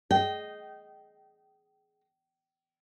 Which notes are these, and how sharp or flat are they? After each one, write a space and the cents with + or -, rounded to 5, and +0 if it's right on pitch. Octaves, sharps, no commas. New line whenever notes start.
G#4 +15 D#5 +0 G5 -20